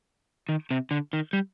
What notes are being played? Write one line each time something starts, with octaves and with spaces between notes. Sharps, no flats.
D#3
C3
D3
D#3
G3